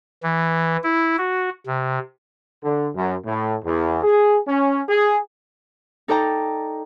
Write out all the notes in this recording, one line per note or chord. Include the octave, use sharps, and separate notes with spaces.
E3
E4
F#4
C3
D3
F#2
A2
E2
G#4
C#4
G#4
D#4 A4 D5 G5 A#5